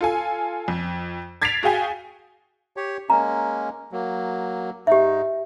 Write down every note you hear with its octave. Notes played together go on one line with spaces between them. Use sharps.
F4 A4 G#5
F2
G#6 A6 B6 C7 D7 F7
F#4 G#4 F5 G5 G#5
G4 C#5
G#3 A#3 C#4 A#5
F#3 A#3
G#2 D#4 G4 E5